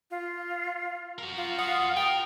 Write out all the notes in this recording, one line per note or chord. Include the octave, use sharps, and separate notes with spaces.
F4
F#4 A#4
F4
F#5 D#6
A#4 G5